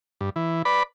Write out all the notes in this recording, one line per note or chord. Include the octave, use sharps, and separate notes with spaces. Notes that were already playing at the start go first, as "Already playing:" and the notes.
G2
E3
B4 D5 B5